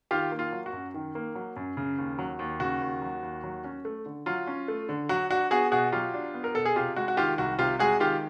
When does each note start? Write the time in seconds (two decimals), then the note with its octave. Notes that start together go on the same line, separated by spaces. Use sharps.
0.11 D#3 F4 G4
0.32 A#3
0.39 F4
0.52 F#3
0.66 F#4
0.73 F#2
0.94 D#3
1.15 A#3
1.35 F#3
1.56 F#2
1.77 C#3
1.98 D#2
2.19 F#3
2.39 D#2
2.60 C#3 F#4
2.81 D#2
3.02 F#3
3.22 D#2
3.44 F#3
3.64 C#4
3.85 A3
4.06 D3
4.26 F#3 F4
4.47 C#4
4.68 A3
4.89 D3
5.09 F#3 F#4
5.30 D4 F#4
5.51 B3 F#4 G#4
5.72 B2 F#4 G#4
5.92 F#3 F4 G4
6.14 D4
6.34 B3
6.44 A#4
6.55 B2 A4
6.65 G#4
6.76 C3 F4 G4
6.96 G#3 F#4
7.08 F#4
7.17 D#3 F4 G4
7.38 C2 F#4
7.59 C3 F4 G4
7.79 G#3 F#4 G#4
8.00 D#3 F4 G4